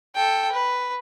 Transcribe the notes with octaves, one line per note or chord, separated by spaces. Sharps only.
A4 G5
B4